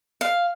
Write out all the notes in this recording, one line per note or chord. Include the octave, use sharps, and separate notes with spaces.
F5